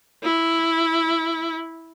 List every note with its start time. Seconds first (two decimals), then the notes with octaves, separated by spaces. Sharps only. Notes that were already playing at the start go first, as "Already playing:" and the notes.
0.23 E4